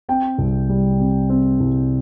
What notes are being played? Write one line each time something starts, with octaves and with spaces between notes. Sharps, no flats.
C4 G5
C2
G3
C3
C4
C2